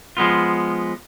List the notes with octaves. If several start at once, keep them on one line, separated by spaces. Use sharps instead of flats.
F3 G#3 B3 F4